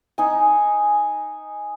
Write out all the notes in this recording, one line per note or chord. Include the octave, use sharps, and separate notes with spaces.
D#4 G#5